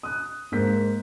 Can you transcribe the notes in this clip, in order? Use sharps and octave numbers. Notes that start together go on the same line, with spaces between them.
D#6 F#6
G#2 G#3 A#3 C5 G6 B6